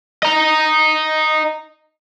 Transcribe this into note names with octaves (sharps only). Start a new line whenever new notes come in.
D#5 A#5